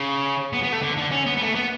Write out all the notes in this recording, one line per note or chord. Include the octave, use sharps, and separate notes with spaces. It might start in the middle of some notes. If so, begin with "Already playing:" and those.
Already playing: C#3
B3
B3
A3
D3
D3
C#4
B3
B3
A3
B3